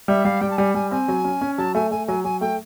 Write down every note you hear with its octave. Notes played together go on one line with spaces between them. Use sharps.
G3 E5
G3 F5
G3 G5
A5
G3 G#5
G3 G#5
C4 G#5
F#3
C#4
C#4
F#3 A5
A3 G#5
A3 G#5
F#3 G#5
F#3 G#5
A3 G5